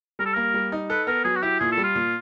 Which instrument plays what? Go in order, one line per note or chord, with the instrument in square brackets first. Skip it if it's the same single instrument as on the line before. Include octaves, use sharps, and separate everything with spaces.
[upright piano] G3 [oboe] A#4
[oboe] A4
[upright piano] A#3 [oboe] A#4
[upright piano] G3
D#4
[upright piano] A4 [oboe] B4
[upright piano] B3 [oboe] A#4
[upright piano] F#3 [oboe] G#4
[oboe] F#4
[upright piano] E4 [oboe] G4
[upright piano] A#2 [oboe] G#4
[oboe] A4
[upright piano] G3
[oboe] F4
[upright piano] A#2